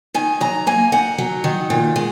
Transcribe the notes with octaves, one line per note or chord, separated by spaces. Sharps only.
D#3 G#5
F#3 A#5
A#3 G#5
D#3 F#5
F#3
D#3
A#2
G#3